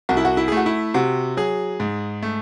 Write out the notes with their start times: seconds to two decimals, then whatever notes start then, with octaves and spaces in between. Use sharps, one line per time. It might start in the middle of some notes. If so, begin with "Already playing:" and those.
0.09 C2 F#4
0.17 E4
0.25 F#4
0.37 E4
0.48 A3 G#4
0.57 F#4
0.66 E4
0.94 C3 F#4
1.37 F#3 G#4
1.80 G#2
2.22 A3